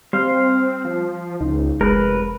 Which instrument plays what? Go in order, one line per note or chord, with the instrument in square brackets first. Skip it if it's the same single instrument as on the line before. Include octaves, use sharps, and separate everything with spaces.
[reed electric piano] G3 [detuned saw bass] C4 [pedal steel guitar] C5 F5
[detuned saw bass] F3
[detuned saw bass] C#2 [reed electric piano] D#4
[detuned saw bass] F1 [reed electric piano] G#3 [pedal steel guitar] A#4 B4